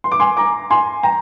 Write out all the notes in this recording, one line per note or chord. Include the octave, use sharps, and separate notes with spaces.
C6
D6
G#5 C6
A#5 D6
G#5 C6
G5 A#5